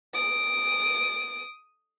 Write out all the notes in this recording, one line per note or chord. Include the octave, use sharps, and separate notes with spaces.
D#6 D7